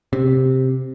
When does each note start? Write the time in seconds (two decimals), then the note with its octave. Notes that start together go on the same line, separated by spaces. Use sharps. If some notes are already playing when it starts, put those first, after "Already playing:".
0.13 C3